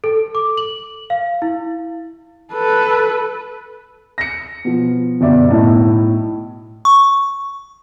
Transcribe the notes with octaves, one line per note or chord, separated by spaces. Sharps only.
A4
D6
F#7
F5
E4
A4 B4
A#6 C#7
B2 F3
G1 F#2 B2 D5 E5
B1 A2 E4
C#6